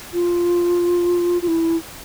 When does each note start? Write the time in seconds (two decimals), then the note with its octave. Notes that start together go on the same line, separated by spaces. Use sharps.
0.14 F4
1.42 F4
1.48 E4